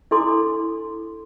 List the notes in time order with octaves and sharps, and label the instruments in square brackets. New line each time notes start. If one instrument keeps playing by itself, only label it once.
[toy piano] D4 E4 A4 C6 D6